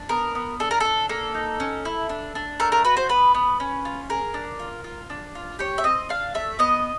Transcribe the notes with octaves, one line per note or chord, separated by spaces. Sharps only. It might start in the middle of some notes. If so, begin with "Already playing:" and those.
Already playing: D4
B3 A#4
B3
D4 A4
A#4
D4 A4
A#3 A4
D#4
C#4
E4
D4
D4
A3 A#4
A#4
F#4 B4
C5
B3 B4
B3
C#4
F4
G#4 A#4
D4
F4
F4
D4
F4
G4 C#5
E5
C4 D#5
D4 F5
A3 E5
B3 D#5